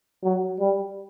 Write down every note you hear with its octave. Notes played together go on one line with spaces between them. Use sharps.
F#3
G3